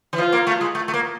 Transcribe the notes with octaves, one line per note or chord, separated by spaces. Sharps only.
E3
F3 F4
A#3
A3
G#3
A3
A3
A#3